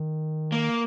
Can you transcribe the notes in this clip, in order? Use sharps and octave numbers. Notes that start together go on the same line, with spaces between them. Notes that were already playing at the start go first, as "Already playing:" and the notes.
Already playing: D#3
A#3